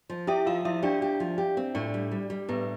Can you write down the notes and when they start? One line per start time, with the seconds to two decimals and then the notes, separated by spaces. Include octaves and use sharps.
0.10 F3
0.27 E4 G4 E5
0.46 F3 F4 F5
0.65 F3 E4 E5
0.83 D4 G4 D5
1.02 G4
1.20 F3
1.38 G4
1.57 C4
1.75 A2 D4 D5
1.94 G3
2.11 G3
2.30 G3
2.49 A2 B3 B4